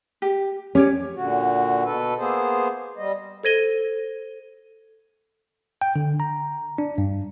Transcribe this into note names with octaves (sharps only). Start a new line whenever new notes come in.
G4
C#4 G4 C#5 D5
A#2 D3 F#4
B2 A4 B4
A#3 B3 G#4 C5
G3 D#5
A4 C5 G#6 A#6 D#7 G7
G5
D3
A#5
D4
G2